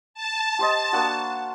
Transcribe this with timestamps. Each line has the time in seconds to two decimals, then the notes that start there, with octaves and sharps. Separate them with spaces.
0.14 A5
0.59 G4 C5 D#5
0.93 A#3 D4 F#4